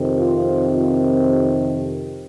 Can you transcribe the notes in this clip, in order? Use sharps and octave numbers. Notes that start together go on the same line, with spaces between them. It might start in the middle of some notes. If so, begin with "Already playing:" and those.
Already playing: F2 C3 D#3
F4